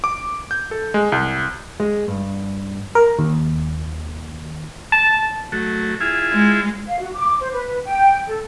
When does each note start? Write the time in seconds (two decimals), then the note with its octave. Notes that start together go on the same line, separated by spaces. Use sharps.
0.04 D6
0.51 G6
0.71 A4
0.94 G#3
1.12 C2
1.80 G#3
2.08 G2
2.95 A#4
3.19 D#2
4.92 A5
5.52 F#3 A3
6.01 E4 F4 G#4
6.33 G#3
6.88 F5
6.99 F#4
7.14 D6
7.40 C5
7.53 B4
7.85 G5
8.27 A4